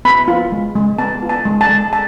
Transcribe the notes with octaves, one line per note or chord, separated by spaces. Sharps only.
B3 B5
F4
G#3
G#3
B3 A5
F4
A5
G#3
A5
G#3
A5